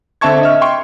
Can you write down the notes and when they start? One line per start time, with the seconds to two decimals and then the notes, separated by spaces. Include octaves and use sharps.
0.21 D3 C4 E5 A5 C#6 G#6
0.41 D#5 E5 F6
0.61 G5 C6 C#6